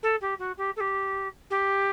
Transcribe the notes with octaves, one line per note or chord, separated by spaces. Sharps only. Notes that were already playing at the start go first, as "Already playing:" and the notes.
A4
G4
F#4
G4
A4
G4
G4